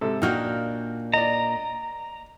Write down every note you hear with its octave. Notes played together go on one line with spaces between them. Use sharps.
G#2 C3 A4
A#2 A#3 D4 D#4 F#4 G5 F6 G6
D5 D#5 A#5